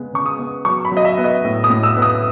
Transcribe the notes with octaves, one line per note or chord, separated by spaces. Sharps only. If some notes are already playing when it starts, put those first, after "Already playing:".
Already playing: C#3 G#3 B3
C#3 C#6
D#6
B3
F#3 C#6
B5
F#3
D#5
E5
B3
D#5
A2
D#6
A2
E6
B3
D#6